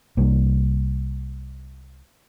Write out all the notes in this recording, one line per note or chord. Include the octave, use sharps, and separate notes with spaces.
C2 A#3